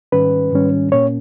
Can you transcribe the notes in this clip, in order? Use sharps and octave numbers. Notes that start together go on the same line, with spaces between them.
G#2 D#3 G3 C#4 B4
G#2 D#3 G3 C#4
A#2 A#3 C#4 C#5